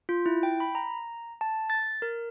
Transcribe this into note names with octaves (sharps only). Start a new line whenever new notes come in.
F4
E4
G5
B5
A#5
A5
A6
A#4